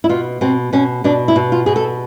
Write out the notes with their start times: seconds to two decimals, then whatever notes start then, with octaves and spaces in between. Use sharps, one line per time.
0.04 E4
0.09 B2 F4
0.41 B2 C4
0.73 B2 C#4
1.04 B2 D4
1.28 E4
1.36 B2
1.52 F4
1.66 B2 G#4
1.76 A4